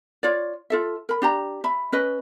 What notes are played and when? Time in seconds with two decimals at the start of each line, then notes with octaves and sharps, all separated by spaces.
0.23 F4 C#5 D5
0.70 F4 A4 E5
1.09 A#4 B5
1.22 D4 G4 A#5
1.64 E5 B5
1.92 C#4 B4 D#5